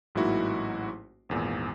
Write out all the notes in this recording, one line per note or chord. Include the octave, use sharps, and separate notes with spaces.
A1 G#2 F#3 A#3 E4 F#4
G#1 E2 A#2